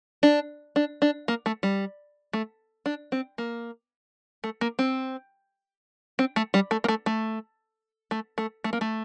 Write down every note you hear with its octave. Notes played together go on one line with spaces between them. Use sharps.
D4
D4
D4
A#3
A3
G3
A3
D4
C4
A#3
A3
A#3
C4
C4
A3
G3
A3
A#3
A3
A3
A3
A3
A3
A#3
A3